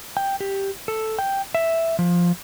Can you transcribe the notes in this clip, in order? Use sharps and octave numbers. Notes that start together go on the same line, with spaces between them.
G5
G4
A4
G5
E5
F3